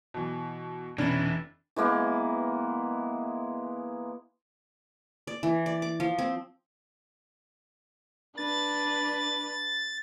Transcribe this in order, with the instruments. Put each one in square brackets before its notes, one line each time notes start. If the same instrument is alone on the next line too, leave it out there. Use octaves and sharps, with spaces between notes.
[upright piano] B2 E3
[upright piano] F1 [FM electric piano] B2 C#4 [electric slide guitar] E3 [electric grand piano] D4 A6
[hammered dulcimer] E3 G#3 A#3 B3
[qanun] D5
E3
D5
D6
F3
C4
[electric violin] D4 B4 [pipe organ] A6